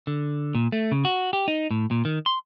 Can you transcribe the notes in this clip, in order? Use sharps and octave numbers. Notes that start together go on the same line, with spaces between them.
D3
A#2
A3
C#3
F#4
G4
D#4
A2
A#2
D#3
C6